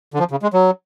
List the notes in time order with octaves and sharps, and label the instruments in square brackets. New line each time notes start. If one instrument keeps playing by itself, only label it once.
[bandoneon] D3
F3
C#3
G#3
F#3